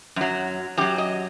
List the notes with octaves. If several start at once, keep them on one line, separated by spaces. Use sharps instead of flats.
F#2 F#3
F#2 F#3 G4
D#5